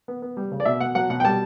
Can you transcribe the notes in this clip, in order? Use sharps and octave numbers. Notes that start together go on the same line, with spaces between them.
B3
B3
G3
C#3
D5
B2 E5
B2 F#5
F#3 F#5
B2 F#5
G5
G3 A5